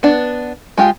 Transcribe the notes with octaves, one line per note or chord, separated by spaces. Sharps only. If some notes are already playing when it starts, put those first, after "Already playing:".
B3 D4
G#3 F4 G4